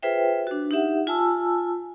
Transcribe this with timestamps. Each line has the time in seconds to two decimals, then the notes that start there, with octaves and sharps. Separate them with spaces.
0.03 F4 G#4 B4 C5 E5 G5
0.47 D4 F#4
0.71 D#4 G4 E5 F#5
1.07 F4 G#5 A5 E6